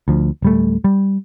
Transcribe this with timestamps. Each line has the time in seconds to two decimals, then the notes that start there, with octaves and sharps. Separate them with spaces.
0.08 D2 F3
0.42 D1 G3 A3
0.84 G3